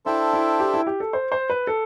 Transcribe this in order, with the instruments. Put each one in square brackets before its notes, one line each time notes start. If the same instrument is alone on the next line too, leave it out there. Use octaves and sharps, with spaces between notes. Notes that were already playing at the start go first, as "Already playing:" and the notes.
[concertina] D4 A4 C5 E5 G5 [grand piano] E4
[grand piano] E4
G4
E4
G4
A4
C5
C5
B4
A4